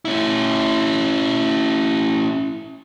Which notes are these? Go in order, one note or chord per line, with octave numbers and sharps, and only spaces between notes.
C#4 E4